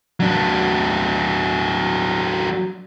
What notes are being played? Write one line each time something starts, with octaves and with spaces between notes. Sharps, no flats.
F#3 D4